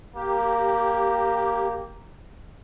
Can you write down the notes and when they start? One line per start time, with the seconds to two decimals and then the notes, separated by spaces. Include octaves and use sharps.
0.16 A#3 G4